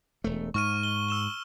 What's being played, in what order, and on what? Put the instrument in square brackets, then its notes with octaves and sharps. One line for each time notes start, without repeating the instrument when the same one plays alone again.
[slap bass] E1 A3
[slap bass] G#2 [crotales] C#6 F6 D#7
[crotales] G7
E6 E7 G7